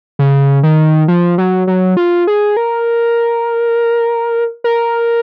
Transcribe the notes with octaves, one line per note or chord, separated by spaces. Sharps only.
C#3
D#3
F3
F#3
F#3
F4
G#4
A#4
A#4